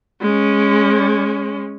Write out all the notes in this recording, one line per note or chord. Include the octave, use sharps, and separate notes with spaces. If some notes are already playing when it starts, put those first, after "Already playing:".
G#3 C#4